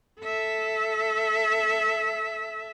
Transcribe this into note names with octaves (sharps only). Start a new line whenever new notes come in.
A4 E5